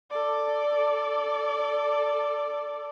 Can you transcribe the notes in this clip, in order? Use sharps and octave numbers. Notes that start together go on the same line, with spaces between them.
A4 D5